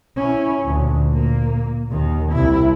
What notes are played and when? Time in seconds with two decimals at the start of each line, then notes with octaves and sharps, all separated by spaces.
0.16 C#4 E4
0.63 D2 A#2
1.11 A#2 A#3
1.91 D#2 D#3
2.33 C2 E4